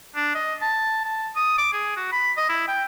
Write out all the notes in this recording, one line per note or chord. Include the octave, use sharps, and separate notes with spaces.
D4
D#5
A5
A5
D#6
D6
G#4
F#4
B5
D#5
E4
G5